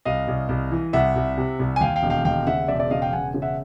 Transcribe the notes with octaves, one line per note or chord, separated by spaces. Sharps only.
C2 D#5 F5
C2
C2
E3
C2 E5 F#5
C2
C3
C2
G#5
D#2 F5 G5
F5 G5
E1
F5 G5
D#2 F5 G5
C#3 E5 F#5
E1 D5 E5
D5 E5
C#3 D#5 F5
F5 G5
E1 F#5 G#5
C#3
E5 F#5